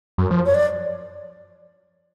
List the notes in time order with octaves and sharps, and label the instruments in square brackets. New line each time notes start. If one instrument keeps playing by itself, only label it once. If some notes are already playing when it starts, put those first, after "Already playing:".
[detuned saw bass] F#2
F3
[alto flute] C#5
D5